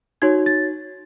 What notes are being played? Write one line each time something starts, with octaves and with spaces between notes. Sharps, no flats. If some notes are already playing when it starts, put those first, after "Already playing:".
D#4 F#4 C#5 G#6
A6